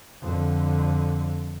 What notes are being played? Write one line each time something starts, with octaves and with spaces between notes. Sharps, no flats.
F2 D3